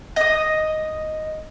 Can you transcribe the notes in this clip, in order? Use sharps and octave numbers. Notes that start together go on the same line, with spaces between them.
D#5 D#6